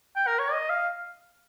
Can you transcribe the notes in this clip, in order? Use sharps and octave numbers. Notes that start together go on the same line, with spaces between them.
G5
A#4
C#5
D#5
F5